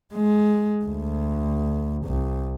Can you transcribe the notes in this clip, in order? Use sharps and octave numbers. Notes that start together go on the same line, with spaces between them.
G#3
D2
C2